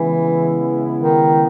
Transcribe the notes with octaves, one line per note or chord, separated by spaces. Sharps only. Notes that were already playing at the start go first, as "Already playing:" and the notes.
Already playing: C#3 E3 G#3 B3 E4
D#3